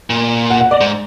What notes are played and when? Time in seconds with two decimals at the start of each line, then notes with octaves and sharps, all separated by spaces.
0.10 A#2
0.50 F#5
0.61 F#5
0.71 D5
0.81 G#2